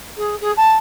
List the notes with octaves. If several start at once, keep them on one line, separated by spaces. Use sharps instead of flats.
G#4
G#4
A5